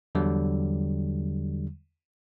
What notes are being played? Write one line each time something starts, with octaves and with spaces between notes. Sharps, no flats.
E2 D3 F#3 G3